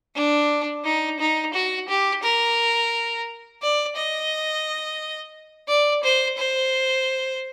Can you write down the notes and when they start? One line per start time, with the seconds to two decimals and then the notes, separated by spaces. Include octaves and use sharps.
0.16 D4
0.85 D#4
1.20 D#4
1.54 F#4
1.89 G4
2.23 A#4
3.62 D5
3.96 D#5
5.68 D5
6.04 C5
6.38 C5